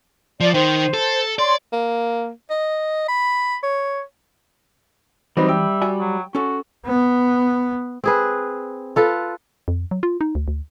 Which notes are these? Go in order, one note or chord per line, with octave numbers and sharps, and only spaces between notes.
F3 D5
D#3 C5
A4
C#5 D5 C6
A#3
D#5
B5
C#5
E3 F#3 G3 C4 D#4 B4
E5 G5
F#4 D5 G#5
F#3
C#4 F#4 A4
B3
C4 G#4 B4
F4 A4 B4
F2
F#3
F4
D#4
D2
D2